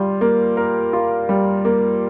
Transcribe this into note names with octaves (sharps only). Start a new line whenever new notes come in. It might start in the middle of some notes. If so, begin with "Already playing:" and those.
Already playing: G3 F4
A#3
A#4
F4
G3
A#3